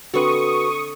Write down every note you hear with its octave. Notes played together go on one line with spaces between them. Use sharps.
D3 C4 F#4 B4 F#5 C#6 D#6